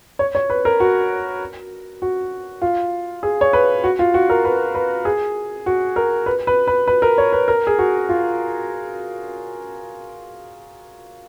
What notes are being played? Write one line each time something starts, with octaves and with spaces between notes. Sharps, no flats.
C#5
C#5
B4
A#4
F#4
F#4
F4
G#4
C#5
B4
F#4
F4
F#4
A#4
B4
B4
G#4
F#4
A#4
B4
B4
B4
B4
A#4
C#5
B4
A#4
G#4
F#4
F4